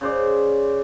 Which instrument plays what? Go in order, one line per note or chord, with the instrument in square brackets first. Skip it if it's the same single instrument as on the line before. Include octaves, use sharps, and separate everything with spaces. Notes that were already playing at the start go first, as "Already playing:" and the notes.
[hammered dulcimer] C#3 C5 D5